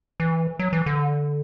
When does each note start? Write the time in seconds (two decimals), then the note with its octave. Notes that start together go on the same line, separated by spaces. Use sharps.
0.20 E3
0.59 F#3
0.73 E3
0.86 D3